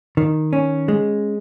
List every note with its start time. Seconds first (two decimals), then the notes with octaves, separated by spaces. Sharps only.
0.17 D#3
0.53 C#4
0.88 G#3